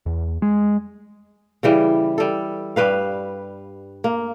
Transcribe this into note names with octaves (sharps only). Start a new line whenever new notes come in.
E2
G#3
C#3 E3 G3
G3 A4
G2 G3 B4 F5
A#3